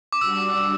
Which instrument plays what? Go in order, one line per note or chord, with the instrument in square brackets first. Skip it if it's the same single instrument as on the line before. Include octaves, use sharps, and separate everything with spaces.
[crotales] D6
[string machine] G3 D4 F#4 [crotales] E6